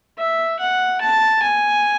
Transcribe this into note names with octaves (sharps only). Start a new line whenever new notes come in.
E5
F#5
A5
G#5